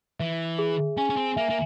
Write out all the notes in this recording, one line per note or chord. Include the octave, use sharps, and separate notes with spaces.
E3 E5
G#4
C#4 G#5
C#4
C4
A#3 E5
A#3